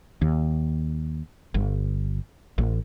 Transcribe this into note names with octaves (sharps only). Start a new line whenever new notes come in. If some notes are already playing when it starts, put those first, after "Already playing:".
D#2
G1
A1